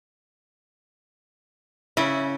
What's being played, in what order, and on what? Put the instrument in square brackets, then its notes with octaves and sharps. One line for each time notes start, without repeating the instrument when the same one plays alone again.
[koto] C#3 [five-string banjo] E4